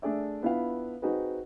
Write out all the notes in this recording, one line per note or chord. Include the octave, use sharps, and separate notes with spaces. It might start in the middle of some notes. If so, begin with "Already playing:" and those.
A3 D4 G#4 D5 E5
B3 D4 E4 F4 B4 F5
C4 D#4 F#4 G#4 B4